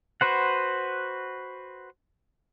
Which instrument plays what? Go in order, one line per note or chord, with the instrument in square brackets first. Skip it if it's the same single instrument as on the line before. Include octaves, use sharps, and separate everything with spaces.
[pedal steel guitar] F#4 B4 C5 F#5